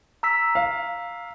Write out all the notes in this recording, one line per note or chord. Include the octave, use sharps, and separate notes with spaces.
A#5 E6 B6
F5